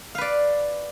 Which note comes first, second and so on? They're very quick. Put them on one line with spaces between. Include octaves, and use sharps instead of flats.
F5 B4 D5